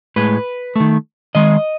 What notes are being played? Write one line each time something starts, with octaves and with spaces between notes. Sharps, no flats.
A2 G#3 B4
D#3 A3
D#3 G#3 D#5